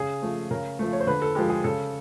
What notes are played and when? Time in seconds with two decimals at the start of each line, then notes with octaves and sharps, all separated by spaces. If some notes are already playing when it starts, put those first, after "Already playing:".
Already playing: C#3 G#4
0.22 F3 A3
0.51 C#3 A#4
0.79 F3 A3
0.93 C#5
1.00 C5
1.07 D3 B4
1.22 A4
1.35 F3 G#3 G4
1.50 G#4
1.64 C#3 A4